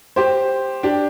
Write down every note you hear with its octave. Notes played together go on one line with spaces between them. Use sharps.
G4 C5
D4 G4